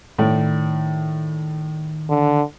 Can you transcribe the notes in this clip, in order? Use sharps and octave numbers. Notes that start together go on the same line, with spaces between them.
A2 D#3 D5
D3